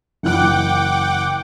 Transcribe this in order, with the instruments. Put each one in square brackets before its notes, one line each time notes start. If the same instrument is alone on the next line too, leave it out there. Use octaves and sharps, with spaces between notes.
[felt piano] F#1 E3 F#6 [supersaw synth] F#5 G5 D6